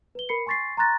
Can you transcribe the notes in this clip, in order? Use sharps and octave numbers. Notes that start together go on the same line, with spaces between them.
B4 G7
A#4 B5 C7 C#7
G#5 C6 C#6 A6 B6 C7
A#5 C6 C#6 F#6 A6 A#6